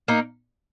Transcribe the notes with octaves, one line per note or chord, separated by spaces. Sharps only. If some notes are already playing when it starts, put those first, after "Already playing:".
A#3 D#4